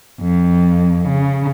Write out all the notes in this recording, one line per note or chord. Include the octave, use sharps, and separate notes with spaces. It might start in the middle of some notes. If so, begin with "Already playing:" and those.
F2
C#3